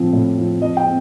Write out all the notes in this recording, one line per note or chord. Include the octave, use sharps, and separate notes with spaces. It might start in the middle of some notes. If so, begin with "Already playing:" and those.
Already playing: A2 F3 C4 F4
A2
F3 C4 F4
F3 D#5
G5
C4